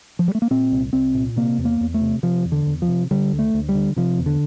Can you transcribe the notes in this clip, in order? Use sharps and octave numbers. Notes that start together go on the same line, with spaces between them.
F3
G3
A3
A#3
A#2 C4
C2
C2 C4
A#2
C3 A#3
E2
A#3
E2
A3
C3
C3 F3
E2
D3
E2
F3
C3
D3 G3
D2
A3
D2
G3
D3
C3 F3
E2
D3